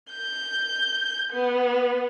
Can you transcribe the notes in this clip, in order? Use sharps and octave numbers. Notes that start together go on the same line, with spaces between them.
G6
B3